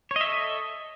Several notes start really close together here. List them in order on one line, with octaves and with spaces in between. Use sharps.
C#5 D#5 E5 A4